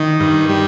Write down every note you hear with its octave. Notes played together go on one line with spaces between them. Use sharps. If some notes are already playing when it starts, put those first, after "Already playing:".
Already playing: D#3
G2
G3